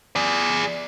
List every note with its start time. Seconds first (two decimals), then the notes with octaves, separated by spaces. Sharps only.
0.16 G#4 D5